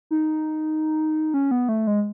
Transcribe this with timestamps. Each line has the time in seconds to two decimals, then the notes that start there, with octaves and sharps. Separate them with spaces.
0.11 D#4
1.34 C#4
1.51 B3
1.69 A3
1.87 G#3